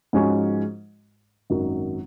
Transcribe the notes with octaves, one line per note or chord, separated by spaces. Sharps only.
G#2 F3 G#3 C#4 F#4
G#1 F#2 D#3 F#3